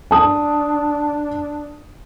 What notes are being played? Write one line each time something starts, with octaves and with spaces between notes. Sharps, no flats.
D4 A5 D#6